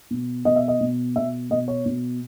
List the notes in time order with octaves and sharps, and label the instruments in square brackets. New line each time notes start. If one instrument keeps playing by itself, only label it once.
[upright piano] B2
B2 D#5
E5
D#5
B2
B2 E5
B2 D#5
C#5
B2